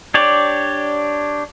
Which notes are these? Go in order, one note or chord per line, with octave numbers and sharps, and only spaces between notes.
D4 G4 C#5 D5